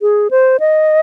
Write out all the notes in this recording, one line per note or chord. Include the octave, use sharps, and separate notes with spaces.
G#4
C5
D#5